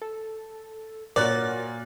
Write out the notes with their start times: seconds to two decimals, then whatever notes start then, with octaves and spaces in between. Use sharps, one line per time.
0.02 A4
1.16 A#2 F#4 A#4 C#5 D5 F#6 A6